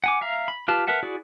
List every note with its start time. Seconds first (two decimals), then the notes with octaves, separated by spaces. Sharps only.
0.04 F#5 G#5 D6
0.21 E5 F5 A#5
0.48 B5
0.68 F4 G4 B4 F5 A5
0.87 A#4 B4 E5 F#5 A5
1.03 E4 F#4 G#4 D5